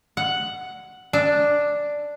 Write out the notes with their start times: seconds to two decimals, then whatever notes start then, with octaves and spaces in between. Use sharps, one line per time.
0.17 F#5
1.13 D4